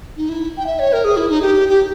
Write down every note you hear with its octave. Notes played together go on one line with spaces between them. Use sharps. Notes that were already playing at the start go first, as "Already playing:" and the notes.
D#4
E4
G5
E5
C#5
A#4
G#4
E4
D#4
G4
G4